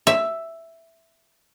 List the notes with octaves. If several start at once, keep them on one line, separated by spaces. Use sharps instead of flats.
E5